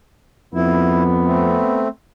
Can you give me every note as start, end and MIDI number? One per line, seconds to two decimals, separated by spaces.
0.54 1.60 41
0.54 1.85 59
0.54 1.03 64
1.26 1.88 57
1.26 1.88 60